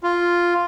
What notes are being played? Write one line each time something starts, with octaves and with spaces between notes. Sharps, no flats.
F4